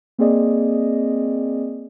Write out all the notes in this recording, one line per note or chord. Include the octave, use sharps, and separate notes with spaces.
A#3 C4 G#4 D5 D#5